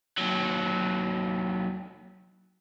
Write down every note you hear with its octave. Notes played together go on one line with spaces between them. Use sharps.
D#2 F#3